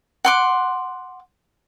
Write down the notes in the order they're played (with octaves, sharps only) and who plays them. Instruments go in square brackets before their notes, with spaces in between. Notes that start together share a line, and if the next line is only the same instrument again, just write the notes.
[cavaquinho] F#5 C6 D6